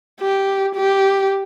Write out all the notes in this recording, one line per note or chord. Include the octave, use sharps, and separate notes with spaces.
G4
G4